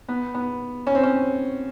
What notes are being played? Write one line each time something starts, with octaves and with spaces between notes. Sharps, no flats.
B3
B3
C#4
C4
C#4